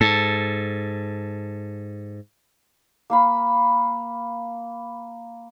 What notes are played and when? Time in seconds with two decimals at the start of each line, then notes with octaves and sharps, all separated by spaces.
0.01 G#2 A4
3.10 A#3 F5 B5